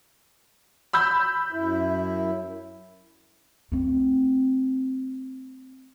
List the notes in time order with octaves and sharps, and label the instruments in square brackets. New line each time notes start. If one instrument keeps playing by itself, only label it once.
[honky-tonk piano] B5 E6 G6
[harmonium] F#2 E4
[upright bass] A3 C4